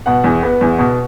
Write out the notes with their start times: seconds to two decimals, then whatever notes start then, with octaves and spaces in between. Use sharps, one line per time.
0.06 B2 F#5
0.24 E2
0.43 B3
0.61 E2
0.79 B2